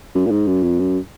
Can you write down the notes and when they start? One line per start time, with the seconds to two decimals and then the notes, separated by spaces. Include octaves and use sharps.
0.15 F#2
0.27 A#2
0.31 G#2
0.47 F#2
0.63 F2
0.79 F#2